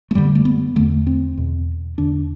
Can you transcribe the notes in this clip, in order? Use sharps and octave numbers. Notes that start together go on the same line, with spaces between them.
A3
F#2 D3 G3
A3
B3
E2 D3 A3
C4
E2 B2
E2 D3 D4